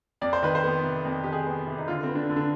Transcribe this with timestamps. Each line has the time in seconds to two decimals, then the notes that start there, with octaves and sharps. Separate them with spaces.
0.21 F2 D5
0.33 C5
0.43 D#3 B4
0.55 C5
0.64 B3
0.84 C3
1.05 F2
1.24 D#3 G4
1.32 G#4
1.46 B3
1.67 C3
1.78 D#4
1.88 D3 F4
2.04 C4
2.09 B3
2.15 D4
2.30 D3
2.36 D4